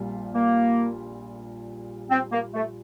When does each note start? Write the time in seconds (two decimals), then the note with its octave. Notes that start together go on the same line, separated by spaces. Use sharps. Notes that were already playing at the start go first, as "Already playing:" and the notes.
Already playing: A#1 A#2 G3 F4
0.34 A#3
2.10 C4
2.32 A#3
2.54 A3